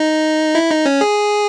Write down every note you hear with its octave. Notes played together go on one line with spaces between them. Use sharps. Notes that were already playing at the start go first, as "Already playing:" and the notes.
Already playing: D#4
E4
D#4
C#4
G#4